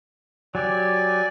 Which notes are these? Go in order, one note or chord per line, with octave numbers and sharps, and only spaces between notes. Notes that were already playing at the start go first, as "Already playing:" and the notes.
F#3 G4 D5 G#5